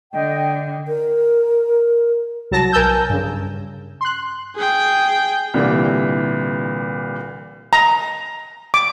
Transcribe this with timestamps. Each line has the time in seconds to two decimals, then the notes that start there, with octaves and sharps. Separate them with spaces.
0.14 D3 D#5 G5
0.88 A#4
2.51 C2 F#3 A5 A#6
2.72 B1 A#4 G#5 A5 E6 G6
3.09 G2 C#3
4.01 C6 F#6
4.56 G#4 G5
5.54 C2 A#2 D3 E3 G3
7.73 A#5
8.74 D6